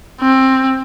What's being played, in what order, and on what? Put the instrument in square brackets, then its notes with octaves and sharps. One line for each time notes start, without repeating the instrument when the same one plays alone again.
[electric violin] C4